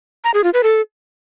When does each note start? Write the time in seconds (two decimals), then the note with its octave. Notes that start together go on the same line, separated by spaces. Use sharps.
0.24 A#5
0.34 G#4
0.44 F4
0.54 B4
0.63 A4